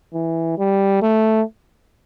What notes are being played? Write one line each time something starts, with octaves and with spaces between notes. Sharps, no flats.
E3
G3
A3